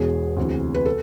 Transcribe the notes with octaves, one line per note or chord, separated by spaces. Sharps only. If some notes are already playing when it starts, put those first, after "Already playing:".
Already playing: E1 E2 B2 G#4
D2 C3 E3
B4
A4